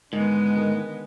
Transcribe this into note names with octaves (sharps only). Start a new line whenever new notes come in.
G#2 D3 D#3 G#3 B3
D#3 G#4